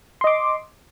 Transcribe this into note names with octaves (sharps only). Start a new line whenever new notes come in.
D#5 C6 D6